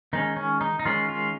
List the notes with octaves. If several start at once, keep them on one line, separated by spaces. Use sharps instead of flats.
D#3 G#3 C#4 D#4
C#4
D#4
D#4
D#3 G#3 C#4 F4
F4